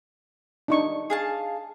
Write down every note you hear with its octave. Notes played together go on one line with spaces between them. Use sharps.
D4 D#4 C#6
G#4 F5 A5